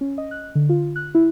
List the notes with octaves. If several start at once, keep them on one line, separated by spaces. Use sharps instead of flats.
C#4
D#5
F#6
D3
F4
F#6
E4